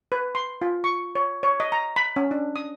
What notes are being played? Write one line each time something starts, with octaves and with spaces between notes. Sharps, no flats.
B4
C6
F4
C#6
C#5
C#5
D#5
A#5
B5
C#4
D4
D#6